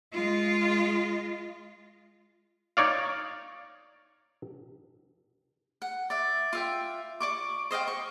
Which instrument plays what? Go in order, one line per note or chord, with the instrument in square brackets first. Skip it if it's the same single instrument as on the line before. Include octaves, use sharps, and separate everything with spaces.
[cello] G#3 F4
[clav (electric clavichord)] D#4 C#5 D5 F5
[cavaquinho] F#5
D5 E5
F4 E5 G5
D5 C#6 D6
C5 D#5 F5 G5
C#6